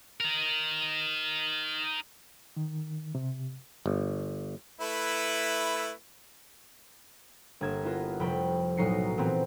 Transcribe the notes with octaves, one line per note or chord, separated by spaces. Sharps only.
D#4 A#4
D#3
C3
G1
A3 E4 B4
G1 A#3 G#6 E7
B3 E4 F4 A#4
F1 F2 G5 B5
B1 A2 F#3 D#4 C7 C#7
A#2 E3 B3 C4